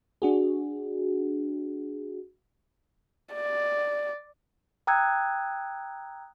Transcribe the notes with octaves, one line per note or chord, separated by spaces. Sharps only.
D4 F#4 G#4
D5
G5 A#5 D#6 E6 F#6 G#6